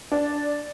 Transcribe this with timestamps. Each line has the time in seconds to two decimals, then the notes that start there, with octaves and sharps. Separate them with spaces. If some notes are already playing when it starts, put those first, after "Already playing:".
0.12 D4